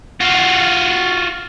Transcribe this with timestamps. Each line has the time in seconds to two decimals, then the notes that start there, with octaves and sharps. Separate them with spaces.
0.21 F4 F#4